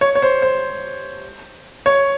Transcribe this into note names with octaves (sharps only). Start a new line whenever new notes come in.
C#5
C#5
C5
C5
C#5